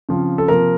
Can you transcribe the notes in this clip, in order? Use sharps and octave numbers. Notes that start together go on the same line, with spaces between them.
C#3 F3 C4
A4
C3 F3 A#3 A#4